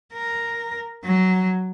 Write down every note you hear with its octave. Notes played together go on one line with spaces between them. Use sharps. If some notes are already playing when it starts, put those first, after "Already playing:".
A#4
F#3